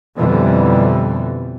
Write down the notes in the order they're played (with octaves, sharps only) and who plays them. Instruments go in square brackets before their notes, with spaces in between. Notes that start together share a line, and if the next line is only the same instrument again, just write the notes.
[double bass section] F2 B2 D3 E3 G3